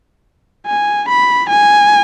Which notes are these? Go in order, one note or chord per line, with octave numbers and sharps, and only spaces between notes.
G#5
B5
G#5